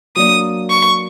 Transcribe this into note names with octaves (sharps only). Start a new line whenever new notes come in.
F#3 A#3 D4 D#6
C#6